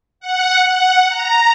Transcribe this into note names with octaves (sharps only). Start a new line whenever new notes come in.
F#5
F#5
A#5